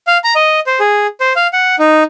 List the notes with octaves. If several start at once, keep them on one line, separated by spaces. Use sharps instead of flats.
F5
A#5
D#5
C5
G#4
C5
F5
F#5
D#4